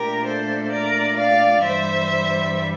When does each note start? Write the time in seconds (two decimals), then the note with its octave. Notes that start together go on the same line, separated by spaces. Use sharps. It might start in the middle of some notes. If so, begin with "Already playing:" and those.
Already playing: A#2 A3 D4 G4 A#4
0.26 A4 C5
0.72 A#4 D5
1.18 D5 F5
1.64 G2 E3 G3 C5 E5